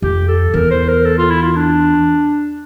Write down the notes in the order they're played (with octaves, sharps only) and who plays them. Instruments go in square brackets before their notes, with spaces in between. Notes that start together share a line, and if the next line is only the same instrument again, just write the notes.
[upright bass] F2 [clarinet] G4
[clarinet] A4
[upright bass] E2 [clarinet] A#4
[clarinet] C5
A#4
A4
F4
E4
F4
D4